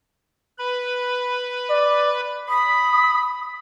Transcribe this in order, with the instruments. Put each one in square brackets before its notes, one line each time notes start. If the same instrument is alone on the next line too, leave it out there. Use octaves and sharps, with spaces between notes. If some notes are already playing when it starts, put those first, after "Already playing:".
[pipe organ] B4 B5
[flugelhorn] D5
[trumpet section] B5 [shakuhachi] D#6